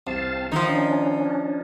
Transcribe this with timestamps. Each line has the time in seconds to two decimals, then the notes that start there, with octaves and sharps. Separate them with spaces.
0.07 C2 C4 F5 A5
0.52 D#3 F3 D#4 E4
0.69 C#4 D4